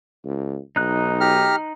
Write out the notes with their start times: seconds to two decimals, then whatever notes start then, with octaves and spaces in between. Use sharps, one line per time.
0.24 C#2
0.76 B1 D#4 F#6
1.20 G4 A#5 F6